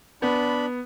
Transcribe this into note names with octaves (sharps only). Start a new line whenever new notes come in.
B3 D4 B5